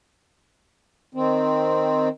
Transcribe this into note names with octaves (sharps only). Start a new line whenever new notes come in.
D#3 C4